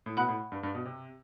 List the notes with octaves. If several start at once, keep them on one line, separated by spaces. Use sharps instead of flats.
A2
B2 F#5 B5 F#6
A2
G2
G2
B2
C3